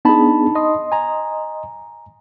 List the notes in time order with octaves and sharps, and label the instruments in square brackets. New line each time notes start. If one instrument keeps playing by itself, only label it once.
[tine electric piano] B3 D4 G#4 [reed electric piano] D#4 A5 B5
[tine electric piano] D#5 C6 D#6
[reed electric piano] G#5 A#5